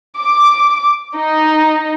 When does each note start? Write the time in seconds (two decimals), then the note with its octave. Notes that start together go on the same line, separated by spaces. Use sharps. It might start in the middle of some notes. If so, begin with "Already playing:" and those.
0.19 D6
1.16 D#4